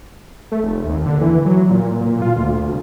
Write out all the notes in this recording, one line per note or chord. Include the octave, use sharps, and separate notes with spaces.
A3
F1
D#2
D3
E3
F#3
A#2
A#2
F4
D2
C2